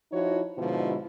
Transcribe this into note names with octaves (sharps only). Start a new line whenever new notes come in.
F3 D#4 E4 F#4 C#5
G#2 B2 D3 F3 E4